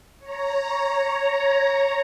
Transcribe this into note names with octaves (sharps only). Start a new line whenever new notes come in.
C#5 A#5